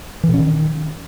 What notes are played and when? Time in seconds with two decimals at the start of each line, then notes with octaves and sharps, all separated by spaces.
0.23 E3
0.29 B2
0.34 C#4
0.39 D#3